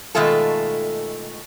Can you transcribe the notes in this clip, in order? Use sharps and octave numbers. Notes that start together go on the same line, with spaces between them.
B2 D#3 G#3 A3 F4 A4